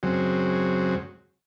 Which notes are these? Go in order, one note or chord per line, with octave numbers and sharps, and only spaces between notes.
F#2 C#3 F#3 G#3 C4